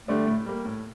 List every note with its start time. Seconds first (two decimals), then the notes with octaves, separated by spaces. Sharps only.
0.08 D3 G3 A3 D4
0.27 A2
0.46 G3 A#3
0.65 A2